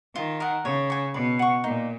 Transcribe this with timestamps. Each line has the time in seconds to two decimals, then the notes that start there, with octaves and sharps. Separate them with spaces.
0.16 D#3 F4
0.40 A#4 D#5 F#5
0.65 C#3 C#5
0.90 G#5 C#6
1.14 B2 B4
1.39 F#5 C#6
1.64 A#2 D#4